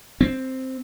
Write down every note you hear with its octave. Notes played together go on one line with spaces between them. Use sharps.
C4